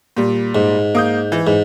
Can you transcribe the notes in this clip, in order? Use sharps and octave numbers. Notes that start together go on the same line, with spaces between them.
A#2 G3
G#2
A#3 D#6 G6
E3
G#2